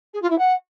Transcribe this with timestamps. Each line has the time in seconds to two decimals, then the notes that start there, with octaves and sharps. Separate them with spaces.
0.13 G#4
0.22 F4
0.30 E4
0.38 F#5